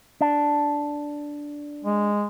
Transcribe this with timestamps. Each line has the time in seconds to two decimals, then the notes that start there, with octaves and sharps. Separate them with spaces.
0.21 D4
1.85 G#3